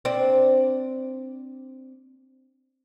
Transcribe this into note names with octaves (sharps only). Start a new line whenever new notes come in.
C4 D4